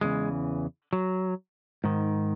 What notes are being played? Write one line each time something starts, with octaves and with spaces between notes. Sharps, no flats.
E2 C#3 E3 G#3
F#3
G#2 D#3